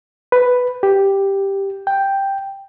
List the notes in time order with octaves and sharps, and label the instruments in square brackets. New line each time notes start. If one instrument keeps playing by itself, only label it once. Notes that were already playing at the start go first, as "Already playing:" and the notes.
[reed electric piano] B4
G4
G5